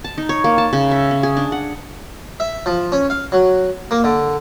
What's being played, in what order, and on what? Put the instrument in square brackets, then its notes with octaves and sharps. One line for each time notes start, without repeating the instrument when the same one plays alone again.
[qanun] A5
D#4
C#5
A#3
A5
C#3
E5
C#4
G#4
D4
F#5
[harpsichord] E5
F3
C#4
F5
F#3
A#3
D3